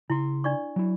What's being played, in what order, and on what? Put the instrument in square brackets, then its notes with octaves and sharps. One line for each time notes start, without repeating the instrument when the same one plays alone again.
[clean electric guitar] C#3 C6 [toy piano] E4
[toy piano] D4 D5 C#6
[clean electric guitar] F#3 E4